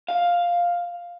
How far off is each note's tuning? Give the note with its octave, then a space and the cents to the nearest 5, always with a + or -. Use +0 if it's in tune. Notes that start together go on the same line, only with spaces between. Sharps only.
F5 +5